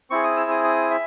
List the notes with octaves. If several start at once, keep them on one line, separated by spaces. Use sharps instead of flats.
C4 E4 G#4 C#6
D#6
E6
D#6
D#6
E5